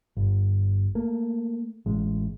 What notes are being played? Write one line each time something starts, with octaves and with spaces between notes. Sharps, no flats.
G1
A3 A#3
A1 G#3